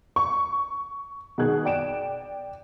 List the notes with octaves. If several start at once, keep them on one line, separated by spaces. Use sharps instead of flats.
C#6
B2 D#3 G#4 F#6 G#6
D5 G5 D7 E7